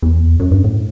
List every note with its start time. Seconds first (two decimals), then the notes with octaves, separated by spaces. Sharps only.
0.02 E2
0.40 F#2
0.51 G2
0.64 A2